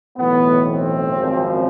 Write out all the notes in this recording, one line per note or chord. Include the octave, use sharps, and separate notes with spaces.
B1 A2 E3 B3
C4
G#1 F#2 C#3 F3